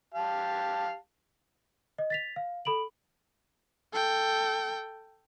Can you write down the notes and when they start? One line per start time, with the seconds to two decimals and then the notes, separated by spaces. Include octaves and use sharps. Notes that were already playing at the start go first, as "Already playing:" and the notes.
0.14 G4 F5 A5
1.98 D#5
2.10 A6 B6 F7
2.36 F5
2.65 A4 B5 D7 F#7
3.93 A4 G5